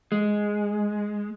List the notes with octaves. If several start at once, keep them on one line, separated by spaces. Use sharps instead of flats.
G#3